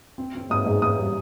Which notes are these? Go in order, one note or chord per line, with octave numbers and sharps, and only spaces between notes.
C4
C4
G#2 D#6
G#2
G#2 D#6
G3